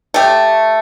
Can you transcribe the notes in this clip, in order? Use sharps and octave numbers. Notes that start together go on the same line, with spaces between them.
A3 G4